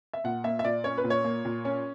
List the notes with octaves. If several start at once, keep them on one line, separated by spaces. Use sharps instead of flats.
E5
A#2 F#5
A#3 E5
E5
A#2 D5
C#4 C#5
B4
A#2
C#5
A#3
A#2
C#4